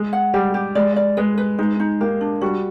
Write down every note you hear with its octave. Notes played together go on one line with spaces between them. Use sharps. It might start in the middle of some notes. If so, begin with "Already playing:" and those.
Already playing: G#3
F#5
G3 G4
G4
G#3 D5
D5
G#3 B4
B4
G#3 D#4
D#4
A#3 G4
D4
G3 F#4